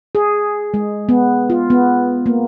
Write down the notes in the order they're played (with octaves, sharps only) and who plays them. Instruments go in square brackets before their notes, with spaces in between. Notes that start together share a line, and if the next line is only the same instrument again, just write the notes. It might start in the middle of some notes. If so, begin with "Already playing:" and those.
[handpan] G#4
G#3
B3
F4
B3
A#3